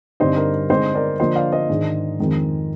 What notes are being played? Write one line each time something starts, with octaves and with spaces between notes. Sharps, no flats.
G2 D3 G3 C4 D#4 C5 D#5
A#4 D5
D3 G#3 C4 D#4 C5 D#5
A#4 D5
D3 F3 A#3 D4 C5 D#5
D5 F5
C5 D#5
G#2 D#3 G#3 D4
F2 D#3 G#3 C4